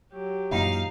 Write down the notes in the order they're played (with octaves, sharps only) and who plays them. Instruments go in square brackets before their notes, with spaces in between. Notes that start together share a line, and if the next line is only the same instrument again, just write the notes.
[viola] F#3 G4
[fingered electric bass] F#2 A#2 E3 [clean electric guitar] D#4 [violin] F5